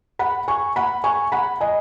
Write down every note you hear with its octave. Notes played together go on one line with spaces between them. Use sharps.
F#5 B5
G#5 C#6
F#5 B5
G#5 C#6
F#5 B5
D#5 G#5